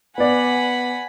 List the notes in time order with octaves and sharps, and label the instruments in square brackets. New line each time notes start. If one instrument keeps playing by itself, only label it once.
[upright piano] B3 D5 [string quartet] F#5 G#5 B5